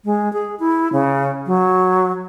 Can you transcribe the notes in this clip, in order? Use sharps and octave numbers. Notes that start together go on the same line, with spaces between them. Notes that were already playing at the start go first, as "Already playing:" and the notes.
G#3
G#4
E4
C#3
F#3